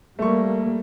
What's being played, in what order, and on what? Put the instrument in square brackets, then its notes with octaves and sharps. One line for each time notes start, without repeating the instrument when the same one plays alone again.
[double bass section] G3 A#3 [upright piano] A3 C#6